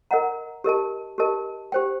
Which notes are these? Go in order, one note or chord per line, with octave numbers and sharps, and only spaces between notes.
A#4 D#5 F#5 A#5
G4 A#4 D#5 A5
G4 A#4 D#5 A5
G4 C5 G5